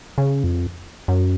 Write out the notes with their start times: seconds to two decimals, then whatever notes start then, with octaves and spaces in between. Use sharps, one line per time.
0.18 C#3
0.44 F2
1.08 F#2